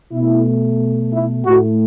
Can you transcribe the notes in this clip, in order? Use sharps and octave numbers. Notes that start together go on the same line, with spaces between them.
B2 A3 E4
E4
A2 A3 F#4